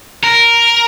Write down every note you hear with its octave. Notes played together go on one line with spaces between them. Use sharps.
A#4